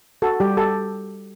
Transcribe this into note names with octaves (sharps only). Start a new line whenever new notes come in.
F#4 A4
G3 G4
G4 A4